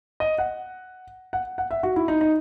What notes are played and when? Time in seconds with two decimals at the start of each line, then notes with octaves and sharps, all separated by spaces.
0.20 D#5
0.38 F#5
1.33 F#5
1.58 F#5
1.71 E5
1.83 F#4
1.96 E4
2.08 D#4
2.21 D#4